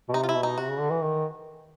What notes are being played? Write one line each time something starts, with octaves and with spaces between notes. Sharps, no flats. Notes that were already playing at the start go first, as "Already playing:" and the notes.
B2
C3 D#4
F4
E4
B2
D#4
C3 F#4
C#3
D3
E3
D#3